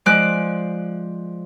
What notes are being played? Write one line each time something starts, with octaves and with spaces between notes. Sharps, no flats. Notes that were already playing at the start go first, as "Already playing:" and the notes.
F3 G#3 D5 F#6